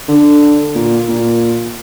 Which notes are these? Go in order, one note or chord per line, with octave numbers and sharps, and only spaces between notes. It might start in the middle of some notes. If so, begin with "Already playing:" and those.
D3
A#2
A#2